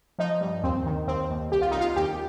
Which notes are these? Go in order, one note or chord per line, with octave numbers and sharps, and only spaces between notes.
F3 D#4
G2
D#2 C4
D#3
D#2 C4
D#2
C2 G4
F4
C2 D#4
F4
D#2 G4